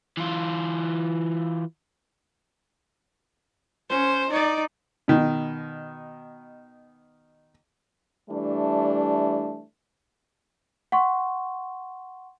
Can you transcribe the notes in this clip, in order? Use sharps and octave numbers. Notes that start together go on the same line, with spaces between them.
E3 F4
C#4 C5
D#4 D5
B2 D#3
E3 G3 A3 D4
F#5 C6 C#6